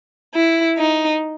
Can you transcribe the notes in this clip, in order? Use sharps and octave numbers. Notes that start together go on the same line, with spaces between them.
E4
D#4